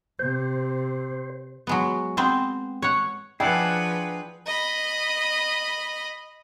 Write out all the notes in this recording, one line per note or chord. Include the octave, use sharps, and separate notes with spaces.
C3 C5
F#3 G#3 B3
B3 C4 C5
C#5 F#5
F3 D4 E4 G#4 B4 F#5 G5
D#5 B5